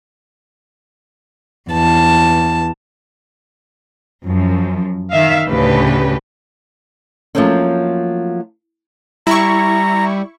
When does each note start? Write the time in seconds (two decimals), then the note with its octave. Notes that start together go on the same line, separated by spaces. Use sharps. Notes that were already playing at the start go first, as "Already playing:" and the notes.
1.71 E2 A5
4.25 F#2 F3
5.10 D#3 E5 F5
5.47 D2 A2 C#3 G4 B4
7.35 F3 F#3 A3 A#3 C4 C#4
9.27 G3 E4 A#5 C#6